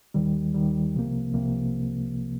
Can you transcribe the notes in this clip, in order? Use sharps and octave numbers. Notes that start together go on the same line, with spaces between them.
D#2 D#3 G3
D#2 D#3 G3
C2 C3 F3 A#3
C2 C3 F3 A#3